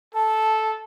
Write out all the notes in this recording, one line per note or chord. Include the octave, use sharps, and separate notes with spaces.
A4 A5